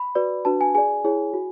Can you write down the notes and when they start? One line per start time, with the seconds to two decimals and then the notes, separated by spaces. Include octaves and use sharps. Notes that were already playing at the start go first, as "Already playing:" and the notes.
Already playing: B5
0.15 F#4 B4 D5
0.45 D4 F#4 B4 A5
0.61 G#5
0.75 G#4 D5 G#5
1.04 E4 G#4 C#5
1.33 F#4